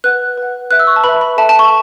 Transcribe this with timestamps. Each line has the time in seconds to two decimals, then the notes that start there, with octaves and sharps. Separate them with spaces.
0.04 B4 F#5 F#6
0.38 B4 F#5
0.71 B4 E5 F#6
0.79 E6
0.87 C#6
0.96 A5
1.04 B4 E5 B5
1.21 B5
1.37 A4 E5 A5
1.49 A5
1.59 C#6